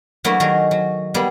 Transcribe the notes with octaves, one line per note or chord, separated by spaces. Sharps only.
F#3 A3 A#3 D4 E4 F#4
D#3 F#3 G#4 A#4
F#3
G3 A#3 B3 G#4